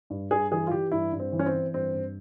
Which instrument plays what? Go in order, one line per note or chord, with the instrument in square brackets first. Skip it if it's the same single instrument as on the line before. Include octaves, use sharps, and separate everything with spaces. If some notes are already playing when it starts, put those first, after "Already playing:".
[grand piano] G2
G2 G#4
E3 G#4
F4
E3 G4
G2 E4
G2
C4
E3
C#4
C4
E3
G2 C4
G2